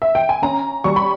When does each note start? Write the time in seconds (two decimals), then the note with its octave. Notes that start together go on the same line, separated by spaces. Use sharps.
0.02 E5
0.15 G5
0.29 G#5
0.42 C#4 A#5
0.84 G3 C#6
0.96 B5